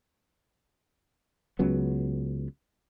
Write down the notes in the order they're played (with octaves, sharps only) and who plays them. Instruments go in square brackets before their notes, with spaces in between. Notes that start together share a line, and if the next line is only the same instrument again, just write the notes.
[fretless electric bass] C#2 C#3 F#3 B3